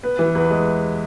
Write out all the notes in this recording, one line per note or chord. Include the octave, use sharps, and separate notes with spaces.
B3 B4
E3
E2 B4
G#3